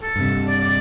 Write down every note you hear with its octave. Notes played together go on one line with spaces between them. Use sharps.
A4
G2 C3
D5
D5